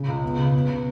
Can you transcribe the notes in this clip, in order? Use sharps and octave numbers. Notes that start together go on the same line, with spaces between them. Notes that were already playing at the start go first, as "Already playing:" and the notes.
Already playing: C#3
C#2
B3
C#3
B3
C#3